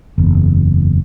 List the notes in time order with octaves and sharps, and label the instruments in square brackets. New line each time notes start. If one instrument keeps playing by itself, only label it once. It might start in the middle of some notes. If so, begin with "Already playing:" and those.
[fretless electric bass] F#1 E2